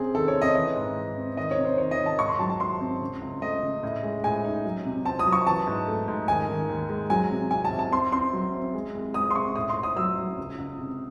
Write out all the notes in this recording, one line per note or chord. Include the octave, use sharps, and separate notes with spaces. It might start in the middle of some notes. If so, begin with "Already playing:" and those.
Already playing: C3 C4 C#4 G#4
D#3 A4
C#5
C4
D#5
E3 D#5
G#2
E3
C4
D#3 D#5
C#5
C3
C5
D#3 C#5
D#5
D#3
A5
G#2 C#6
C6
F#3 A5
A5
G#2 C6
C4
C#3
C#2
A3 D#5
C#3
A2
G#3
A2 G#5
D#4
F#3
C3
C4 A5
D#6
F#3
C#6
E3 A5
G#2
A3
G#2
D#3 G#5
D#3
D#2
G#3
F#3 G#5
C3
C2 G#5
A5
C2
A5
C4 C6
C4 C6
F#3
C4
G#3
C2
G#3 D#6
C6
C3 C#6
A2 D#6
C6
A2
D#6
F#3 E6
F#3
C#2
C#2
C3